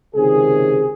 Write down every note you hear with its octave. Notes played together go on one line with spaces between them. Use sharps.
C#2 C3 D#3 G#4